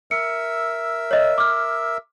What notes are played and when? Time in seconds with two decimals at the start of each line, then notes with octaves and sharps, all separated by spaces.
0.11 A#4 E5 E6 C#7
1.11 C#5 D#5
1.38 D6 F6